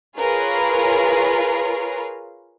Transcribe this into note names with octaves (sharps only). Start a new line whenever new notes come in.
F4 G#4 A#4 B4 C#5 F5